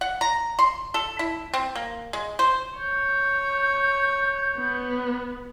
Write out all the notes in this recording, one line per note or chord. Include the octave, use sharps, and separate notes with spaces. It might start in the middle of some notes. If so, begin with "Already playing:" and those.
F#5
A#5
C6
A4
E4
C4
A#3
G#3
C5
C#5 G6
B3